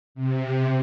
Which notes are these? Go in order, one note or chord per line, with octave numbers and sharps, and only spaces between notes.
C3